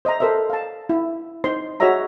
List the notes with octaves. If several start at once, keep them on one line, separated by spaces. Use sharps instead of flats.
C5 D#5 E5 A#5
A4 A#4 C5 D#5 E5
F5 A5
E4
D#4 C5 C6
F#4 G#4 C#5 D#5 E5 A#5